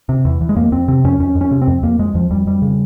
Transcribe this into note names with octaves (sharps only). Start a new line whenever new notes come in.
C3
E2
E2
G#3
F2 A#3
F2 C4
C3 C4
F2 C#4
F2 C#4
F2
C#4
C3
C4
F2
F2 A#3
F2 G#3
F2 F3
F2 G3
F2 G3
C#3